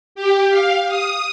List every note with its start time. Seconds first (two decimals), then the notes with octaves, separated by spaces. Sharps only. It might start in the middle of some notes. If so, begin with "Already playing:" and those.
0.15 G4
0.50 F5
0.88 D#6